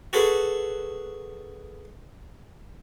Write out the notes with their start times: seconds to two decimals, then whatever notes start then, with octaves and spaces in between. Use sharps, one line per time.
0.13 F#4 G#4 A4 B4